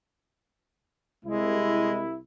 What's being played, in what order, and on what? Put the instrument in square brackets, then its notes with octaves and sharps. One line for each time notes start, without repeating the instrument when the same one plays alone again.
[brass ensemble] C2 E4 [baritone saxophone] G#3